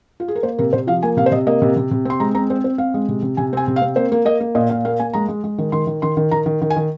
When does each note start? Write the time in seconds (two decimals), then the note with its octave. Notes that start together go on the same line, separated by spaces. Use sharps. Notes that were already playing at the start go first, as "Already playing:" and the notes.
0.20 F4
0.28 G#4
0.35 A#4
0.43 A#3 C5
0.58 C3 A#4
0.73 C3 C5
0.87 F3 F5
1.03 A#3 G#5
1.17 C3 F5
1.26 C5
1.32 C3 D#5
1.47 A#3 D#5
1.62 C3
1.76 C3
1.91 C3
2.05 C4 C6
2.20 G#3 A#5
2.35 C4 A#5
2.50 C4 C5
2.64 C4 C5
2.78 C4 F5
2.94 G#3
3.09 C3
3.22 C3
3.37 C3 G#5
3.53 C4 G#5
3.68 C3
3.76 F5
3.82 C4
3.96 A#3 C5
4.12 A#3
4.25 A#3 D#5
4.40 A#3
4.55 A#2 D#5
4.69 A#2 F5
4.85 A#3 F5
5.00 A#3 G#5
5.13 G#3 A#5
5.28 G#3
5.44 G#3
5.58 D#3
5.72 D#3 C6
5.87 D#3
6.02 D#3 C6
6.17 D#3
6.31 D#3 A#5
6.46 D#3
6.62 D#3
6.70 G#5
6.76 D#3